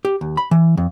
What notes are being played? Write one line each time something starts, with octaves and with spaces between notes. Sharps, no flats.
G4
D#2
B5
E3
F2